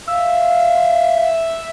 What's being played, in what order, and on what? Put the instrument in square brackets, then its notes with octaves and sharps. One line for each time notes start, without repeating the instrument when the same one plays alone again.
[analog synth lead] E5 [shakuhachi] F5